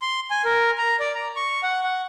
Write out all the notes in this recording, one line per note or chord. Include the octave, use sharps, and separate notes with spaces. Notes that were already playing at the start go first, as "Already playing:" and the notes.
C6
G#5
A#4
A#5
D5
A#5
C#6
F#5
F#5